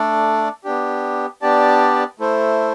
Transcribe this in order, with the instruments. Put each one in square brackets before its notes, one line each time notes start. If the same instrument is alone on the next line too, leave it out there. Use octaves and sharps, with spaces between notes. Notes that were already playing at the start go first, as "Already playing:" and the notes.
Already playing: [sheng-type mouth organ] A3 D4 A4 D5
B3 D4 G4
B3 D4 G4 D5 A5
A3 E4 A4 C5